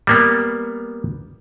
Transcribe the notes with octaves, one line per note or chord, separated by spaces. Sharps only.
G3 A#3 B3